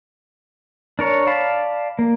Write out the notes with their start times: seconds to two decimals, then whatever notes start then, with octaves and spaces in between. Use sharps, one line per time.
0.99 D4 A#4 C#5
1.27 D5 F5 A5 B5
1.99 A#3